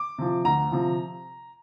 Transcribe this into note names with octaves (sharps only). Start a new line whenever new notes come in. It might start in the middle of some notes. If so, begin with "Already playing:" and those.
Already playing: D6
C3 F3
D2 A#5
C3 F3